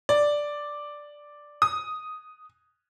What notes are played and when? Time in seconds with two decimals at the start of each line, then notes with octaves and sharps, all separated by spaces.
0.09 D5
1.62 D#6